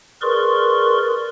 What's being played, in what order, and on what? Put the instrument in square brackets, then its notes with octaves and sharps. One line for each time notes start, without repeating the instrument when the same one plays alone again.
[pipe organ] G#4 A#4 B4 D5 C6 C#6